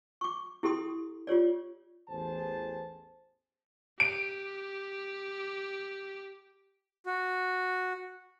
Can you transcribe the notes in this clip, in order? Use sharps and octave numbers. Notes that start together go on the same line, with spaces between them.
C#6 D6
E4 G4 A4 C6 D#6
F4 G4 C#5 D5
A1 E2 G#4 C5 A5
G4 D7
F#4